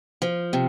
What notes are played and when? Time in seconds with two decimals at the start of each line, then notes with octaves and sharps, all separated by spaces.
0.22 F3
0.53 C3